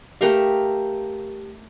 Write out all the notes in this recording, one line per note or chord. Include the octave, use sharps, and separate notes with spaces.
A3 G4 A#4 F5